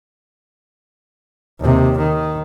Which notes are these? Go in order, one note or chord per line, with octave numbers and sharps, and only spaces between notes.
D#2 C3
D#3